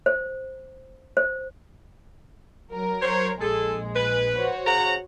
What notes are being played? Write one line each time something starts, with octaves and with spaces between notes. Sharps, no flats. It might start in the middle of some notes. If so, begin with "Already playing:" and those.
C5
C5
F#3 A#4
C5 C#5
A#1 G#3 G#4 A4
B4
F#4 C5 C#5
C#3 F#5 A#5